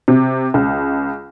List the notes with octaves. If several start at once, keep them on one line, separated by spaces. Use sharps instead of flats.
C3
C#2